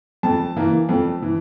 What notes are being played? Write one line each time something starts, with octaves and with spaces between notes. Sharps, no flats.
F2 A5
E3 A#3
F2
E3